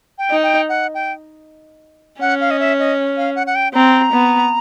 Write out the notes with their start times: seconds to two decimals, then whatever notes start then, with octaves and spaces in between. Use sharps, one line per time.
0.18 G5
0.30 D#4
0.43 G5
0.69 F#5
0.94 G5
2.21 C#4 F#5
2.41 F5
2.51 D#5
2.60 E5
2.79 D#5
3.17 F5
3.36 F#5
3.47 F#5
3.55 G5
3.74 C4 A#5
4.13 B3